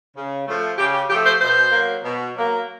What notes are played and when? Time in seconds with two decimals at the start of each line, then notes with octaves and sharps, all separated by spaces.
0.16 C#3
0.47 F3 A3
0.78 C#3 G4
0.94 G4
1.09 F3 G4
1.14 A3
1.26 C5
1.41 B2 C5
1.72 F#3 A#3
2.04 B2
2.35 F#3 A#3